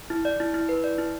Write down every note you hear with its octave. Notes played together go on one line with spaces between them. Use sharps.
E4
D5
E4
E4
B4
D5
E4